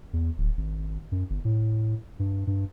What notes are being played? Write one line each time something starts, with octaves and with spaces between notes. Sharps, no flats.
E2
D1
G#1
F#2
G1
A2
G2
G2